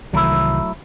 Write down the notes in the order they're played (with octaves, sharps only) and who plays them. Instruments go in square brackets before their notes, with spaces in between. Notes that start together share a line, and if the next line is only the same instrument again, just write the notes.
[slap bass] C2 D#3 E3 [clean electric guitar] F#3 A3 E4